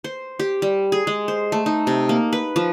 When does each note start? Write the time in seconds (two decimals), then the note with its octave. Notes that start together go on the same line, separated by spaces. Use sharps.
0.04 C5
0.39 G4
0.62 G3
0.92 G#4
1.07 G#3
1.28 C5
1.52 A3
1.66 D#4
1.87 C3
2.09 A#3
2.33 B4
2.56 F3